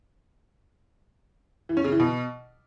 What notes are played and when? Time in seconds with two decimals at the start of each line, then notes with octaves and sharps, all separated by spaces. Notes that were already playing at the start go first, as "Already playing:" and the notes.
1.69 E3
1.77 C#4
1.84 C#3
1.92 E3
2.00 B2